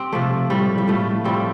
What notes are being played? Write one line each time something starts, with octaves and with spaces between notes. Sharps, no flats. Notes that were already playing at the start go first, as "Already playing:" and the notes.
Already playing: C4 G4
C3 F3 A3
A2 F3 G3
G3
A2 F3 A3
A2 F3 G3 C4